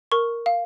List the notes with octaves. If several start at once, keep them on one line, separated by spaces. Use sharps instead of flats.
A#4 C#6
F5